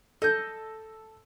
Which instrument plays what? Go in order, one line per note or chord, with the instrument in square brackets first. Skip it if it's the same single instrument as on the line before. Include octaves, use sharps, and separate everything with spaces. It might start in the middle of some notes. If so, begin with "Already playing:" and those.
[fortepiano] A4 [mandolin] D#5 G6